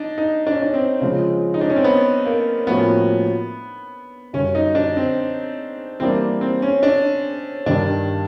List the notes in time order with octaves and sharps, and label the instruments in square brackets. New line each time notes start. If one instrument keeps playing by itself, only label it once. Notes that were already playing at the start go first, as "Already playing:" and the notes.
Already playing: [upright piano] D4 D#4
D#4
D4
C#4
D4
C4
[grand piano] C#3 F3 G#3
[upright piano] D#4
D4
C#4
C4
B3
A#3
[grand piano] A2 F3 A#3 C#4 F#4 [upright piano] B3
[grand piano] F#2 D3 G3 [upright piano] C#4
[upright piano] D#4
D4
C4
[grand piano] E3 G3 A#3 D4 [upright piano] C4
[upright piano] C4
C#4
D4
[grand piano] G2 D#3 G3 [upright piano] D4